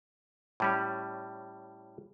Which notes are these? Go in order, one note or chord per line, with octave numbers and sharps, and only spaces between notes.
A2 G3 C#4